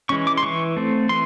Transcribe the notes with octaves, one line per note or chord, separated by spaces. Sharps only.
E3 G#3 C#4 C#6
D6
C6
E3 C#6
A3 C4
E3 C6